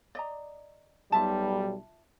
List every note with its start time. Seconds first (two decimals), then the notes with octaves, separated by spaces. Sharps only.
0.15 D5 D#5 A#5
1.12 B1 G3 F4 E5 A5